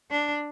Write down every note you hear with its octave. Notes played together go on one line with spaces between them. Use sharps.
D4